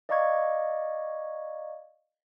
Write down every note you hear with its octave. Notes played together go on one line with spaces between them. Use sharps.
D5 D#5 F5 A#5 C#6 G#6